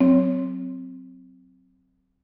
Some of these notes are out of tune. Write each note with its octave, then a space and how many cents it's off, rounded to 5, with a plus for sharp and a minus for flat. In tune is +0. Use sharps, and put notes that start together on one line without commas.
F#3 +0 C4 +0 C#5 +5